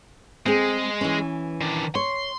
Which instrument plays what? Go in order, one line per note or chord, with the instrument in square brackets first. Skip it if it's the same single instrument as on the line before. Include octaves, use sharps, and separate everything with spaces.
[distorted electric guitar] G#3 [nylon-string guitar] C4 G#4
[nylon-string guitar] E3 C#4
[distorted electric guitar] D#3 D4
[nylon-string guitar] C#5 [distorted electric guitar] C6